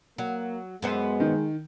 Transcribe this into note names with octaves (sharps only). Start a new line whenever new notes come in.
F#3 A#3
F#2 G#3 B3 C5
D#3